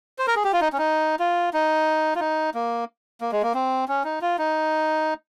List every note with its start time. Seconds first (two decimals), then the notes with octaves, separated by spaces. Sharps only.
0.19 C5
0.27 A#4
0.36 G#4
0.44 G4
0.53 F4
0.61 D#4
0.73 C#4
0.78 D#4
1.19 F4
1.53 D#4
2.15 F4
2.20 D#4
2.54 A#3
3.21 A#3
3.32 G#3
3.43 A#3
3.55 C4
3.88 C#4
4.04 D#4
4.21 F4
4.38 D#4